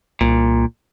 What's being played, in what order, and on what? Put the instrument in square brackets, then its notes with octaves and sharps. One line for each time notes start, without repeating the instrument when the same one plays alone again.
[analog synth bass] C2 [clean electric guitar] A#2